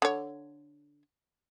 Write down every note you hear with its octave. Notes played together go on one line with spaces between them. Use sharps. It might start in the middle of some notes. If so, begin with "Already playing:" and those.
D3 C#5